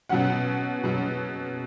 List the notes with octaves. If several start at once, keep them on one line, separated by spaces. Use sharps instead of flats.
B2 F#3 C#4 F#5
B2 F#3 C#4